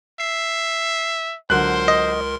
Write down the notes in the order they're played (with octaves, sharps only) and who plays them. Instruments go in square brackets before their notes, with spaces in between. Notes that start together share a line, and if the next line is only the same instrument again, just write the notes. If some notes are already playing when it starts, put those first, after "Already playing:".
[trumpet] E5 [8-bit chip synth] C7
[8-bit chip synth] C#2 A#4 C6 [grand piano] D3 F#3 F#6 [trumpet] C5
[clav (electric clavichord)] D#5